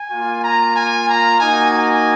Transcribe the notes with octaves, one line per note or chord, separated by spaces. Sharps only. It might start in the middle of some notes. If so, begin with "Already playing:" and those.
Already playing: G#5
A#3 F4
A#5
G#5
A#5
A#3 D#4 F#4 G#5
G#5